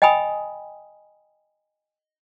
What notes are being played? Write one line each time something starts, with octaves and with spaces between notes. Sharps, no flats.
D#5 G5 G#5 B5 D#6